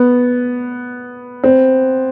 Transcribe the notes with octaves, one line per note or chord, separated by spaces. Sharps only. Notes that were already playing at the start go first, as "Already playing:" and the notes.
Already playing: B3
C4